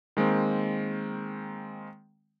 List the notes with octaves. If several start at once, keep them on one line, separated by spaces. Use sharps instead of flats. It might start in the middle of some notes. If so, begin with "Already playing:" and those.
D#3 G#3 A#3 C4